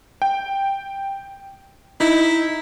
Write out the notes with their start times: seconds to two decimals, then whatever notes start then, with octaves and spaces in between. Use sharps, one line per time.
0.22 G5
2.00 D#4 E4